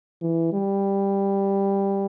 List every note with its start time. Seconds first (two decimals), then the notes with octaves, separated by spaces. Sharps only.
0.21 E3
0.53 G3